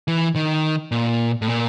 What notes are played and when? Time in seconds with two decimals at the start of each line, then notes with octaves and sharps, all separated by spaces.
0.08 E3
0.36 D#3
0.92 A#2
1.42 A2
1.48 A#2